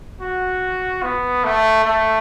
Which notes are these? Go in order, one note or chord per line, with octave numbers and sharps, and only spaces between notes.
F#4
B3
A3
A3